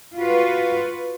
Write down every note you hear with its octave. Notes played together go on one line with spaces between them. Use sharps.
F4 F#4 B4